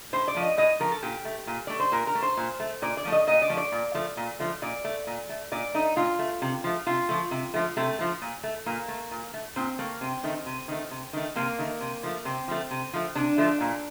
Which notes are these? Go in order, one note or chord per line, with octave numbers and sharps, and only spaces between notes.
A2 C5
D5
F3 A3
D#5
A2 D#5
F3 A3 A#4
A4
A#2 G4
A3
A#2
A3 D5
C5
A#2 A#4
A#4
A3
C5
A#2
A3
A#2 D5
D5
F3 A3
D#5
A#2 D#5
D5
F3 A3
D5
A#2
F3 A3
A#2
F3 A3
A#2 D5
A3
A#2
A3
A#2 D5
A3 D#4
A#2 F4
A3
C3
F3 A3
C3 F4
F3 A3
C3
F3 A3
C3 A3
F3 A3
A#2
A3
A#2 A#3
A3
A#2
A3
A#2 C4
A3 A#3
C3 C4
D#3 A3
C3
D#3 A3
C3
D#3 A3
C3 A#3
D#3 A3
C3
F3 A3
C3 C4
F3 A3
C3
F3 A3
C3 D4
F3 A3
A#2